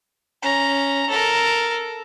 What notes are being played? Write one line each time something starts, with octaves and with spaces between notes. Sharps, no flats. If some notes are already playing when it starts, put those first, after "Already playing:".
C#4 A#5
A4 A#4